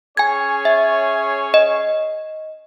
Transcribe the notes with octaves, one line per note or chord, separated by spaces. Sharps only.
C#4 G#4 C#5 G#5 G#6
E5
D#5